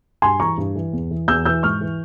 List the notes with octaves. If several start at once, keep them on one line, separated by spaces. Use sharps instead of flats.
G2 G#5 C6
E3 A#5 C#6
G2
E3
E2
E3
E2 E6 G6
E3 E6 G6
G#2 C#6 F6
E3